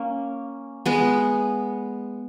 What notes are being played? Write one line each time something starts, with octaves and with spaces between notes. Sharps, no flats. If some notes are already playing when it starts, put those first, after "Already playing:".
Already playing: A#3 C#4
G#3 B3